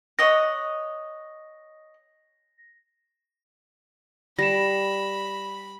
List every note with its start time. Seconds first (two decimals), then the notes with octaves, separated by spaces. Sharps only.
0.19 C#5 D#5 F#5 A#6
4.39 G3 B5 A#6 E7